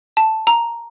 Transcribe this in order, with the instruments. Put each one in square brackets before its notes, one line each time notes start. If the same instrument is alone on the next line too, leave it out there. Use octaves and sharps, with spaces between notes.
[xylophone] A5
A#5